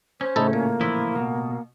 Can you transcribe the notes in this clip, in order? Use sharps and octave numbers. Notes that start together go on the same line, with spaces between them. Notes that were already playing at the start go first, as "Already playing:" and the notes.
C#4 C5
A2 C#3 A3 D#4 E4 A4
A#2 A#3
E3 F3 E4
B2